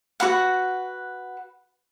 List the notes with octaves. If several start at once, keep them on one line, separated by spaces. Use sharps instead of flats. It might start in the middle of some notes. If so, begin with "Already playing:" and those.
F#4 B4 F#5